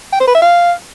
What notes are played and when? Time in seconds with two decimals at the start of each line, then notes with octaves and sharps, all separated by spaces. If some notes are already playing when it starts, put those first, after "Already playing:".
0.13 G5
0.20 C5
0.27 B4
0.35 E5
0.42 F5